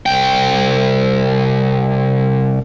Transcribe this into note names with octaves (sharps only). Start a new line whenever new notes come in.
C2 G5